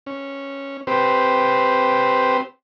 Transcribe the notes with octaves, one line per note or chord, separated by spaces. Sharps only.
C#4
C4 G4 B4 C5